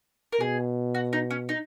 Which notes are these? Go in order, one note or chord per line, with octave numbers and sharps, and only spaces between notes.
A#4
B2 G#4
F#4
D#4
C#4
D#4